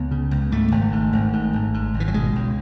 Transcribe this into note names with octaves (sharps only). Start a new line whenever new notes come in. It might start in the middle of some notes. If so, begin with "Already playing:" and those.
Already playing: C#2 B3
C#3
C#2
G#2 A3
G#1
G#2
G#1
G#2
G#1
G#2
G#1
E3
F#3
B2 G#3
C#2